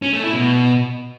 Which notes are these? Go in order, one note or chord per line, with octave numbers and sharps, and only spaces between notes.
C#4
A3
E4
B2